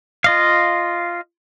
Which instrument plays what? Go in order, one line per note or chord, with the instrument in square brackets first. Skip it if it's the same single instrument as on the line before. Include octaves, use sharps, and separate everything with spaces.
[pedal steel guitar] F4 D#5 F5